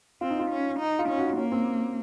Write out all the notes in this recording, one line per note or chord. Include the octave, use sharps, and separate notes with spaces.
C4 F4
D#4
F4
C#4
D#4
F4
C#4 D#4
F#4
F4
A#3 C#4
C4